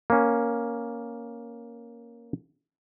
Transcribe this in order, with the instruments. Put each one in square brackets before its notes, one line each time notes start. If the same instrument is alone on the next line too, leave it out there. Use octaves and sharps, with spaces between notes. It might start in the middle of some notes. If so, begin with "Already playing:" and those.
[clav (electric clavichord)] A#3 C#4